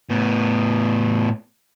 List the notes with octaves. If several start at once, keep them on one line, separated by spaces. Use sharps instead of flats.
A2 B3